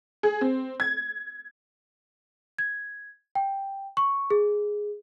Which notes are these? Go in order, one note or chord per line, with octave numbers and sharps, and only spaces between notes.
G#4
C4
G#6
G#6
G5
C#6
G#4